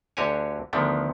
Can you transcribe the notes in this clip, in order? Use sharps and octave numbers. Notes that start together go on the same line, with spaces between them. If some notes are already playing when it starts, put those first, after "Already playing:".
D2 D3 F#4 G4 C#5 G#5
D2 D3 D#3 F3 B3